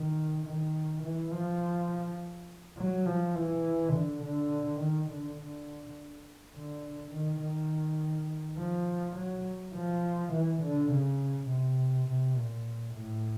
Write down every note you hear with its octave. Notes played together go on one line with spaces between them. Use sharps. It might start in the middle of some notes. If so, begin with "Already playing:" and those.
Already playing: D#3
D#3
E3
F3
F#3
F3
E3
D3
D3
D#3
D3
D3
D3
D#3
D#3
F3
F#3
F3
E3
D3
C#3
C3
C3
A#2
A2